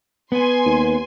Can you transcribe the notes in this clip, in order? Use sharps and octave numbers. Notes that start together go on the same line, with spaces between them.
B3 G#5 C6
D#2